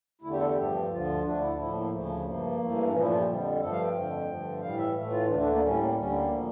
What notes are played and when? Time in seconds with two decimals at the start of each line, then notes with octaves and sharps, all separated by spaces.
0.21 E2 D3 A3 E4
0.31 G4
0.38 A4
0.47 G4
0.56 G2 F3 A3
0.89 D2 D3 F3 F4
1.23 D2 D3 A3 D4
1.40 E4
1.56 A2 F3 A3 E4
1.73 A#3
1.90 D2 C#3 F3 A3
2.24 G2 F3 A3 A#3
2.58 G2 E3 A3
2.86 D4
2.91 A#2 F3 A3 C#4
3.00 E4
3.09 F4
3.17 G4
3.25 F2 D3 G3
3.59 G2 F3 A3 A4
3.71 F5
3.82 G5
3.93 F2 D3 F3 A3
4.27 G2 D3 F3 A3
4.60 A2 E3 G3 F5
4.77 E5
4.94 A2 E3 A3
5.11 F4
5.27 D2 D3 A3 D4
5.38 D4
5.50 A#3
5.61 A2 G3 C#4
5.78 A#3
5.95 D2 D3 G3 C#4
6.12 A#3
6.29 A#2 F3 A3